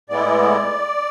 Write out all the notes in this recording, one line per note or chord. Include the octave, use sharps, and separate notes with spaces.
A2 G#3 B3 E4 D5